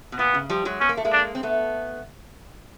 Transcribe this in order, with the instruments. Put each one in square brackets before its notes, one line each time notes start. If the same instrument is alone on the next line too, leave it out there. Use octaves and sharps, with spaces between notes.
[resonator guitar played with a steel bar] B2
[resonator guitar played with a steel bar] A#2 [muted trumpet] B3
[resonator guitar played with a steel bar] C#3
F3 G3
F#3 G#3
[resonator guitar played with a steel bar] B3 [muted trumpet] C#4
[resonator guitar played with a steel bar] A#3
A3
G#3 A#3
[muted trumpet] D4
[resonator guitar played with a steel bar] C4
A3 B3